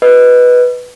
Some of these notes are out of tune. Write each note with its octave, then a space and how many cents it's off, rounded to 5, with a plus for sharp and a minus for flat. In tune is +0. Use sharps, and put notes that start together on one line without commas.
B4 +0 D#5 +0